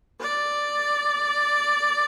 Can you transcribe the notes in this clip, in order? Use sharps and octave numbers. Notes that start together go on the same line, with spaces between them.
D5